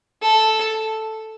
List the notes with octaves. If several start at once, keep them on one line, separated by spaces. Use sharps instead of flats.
A4